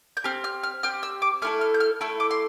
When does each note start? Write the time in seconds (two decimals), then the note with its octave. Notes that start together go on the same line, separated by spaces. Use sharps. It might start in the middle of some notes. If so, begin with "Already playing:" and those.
0.17 G6
0.24 C4 G4 F6
0.44 F6
0.63 F6
0.83 C4 G4 F6
1.03 E6
1.22 D6
1.42 A3 E4 A4 F6
1.61 F6
1.74 G6
1.80 F6
2.01 A3 E4 A4 E6
2.20 D6
2.31 C6